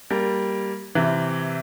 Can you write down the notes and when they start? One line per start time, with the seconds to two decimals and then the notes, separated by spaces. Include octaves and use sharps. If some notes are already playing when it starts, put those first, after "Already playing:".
0.11 G3 A#3
0.95 C3 E3